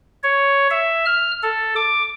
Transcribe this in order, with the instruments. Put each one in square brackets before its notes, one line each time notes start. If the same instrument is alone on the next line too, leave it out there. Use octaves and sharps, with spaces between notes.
[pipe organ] C#5
E5
F6
A4
D6